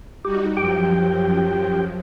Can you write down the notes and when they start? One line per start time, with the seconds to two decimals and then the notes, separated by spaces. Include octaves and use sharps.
0.25 G3 D#4 F#4 G4
0.57 F#2 F3 F#3 G4 G5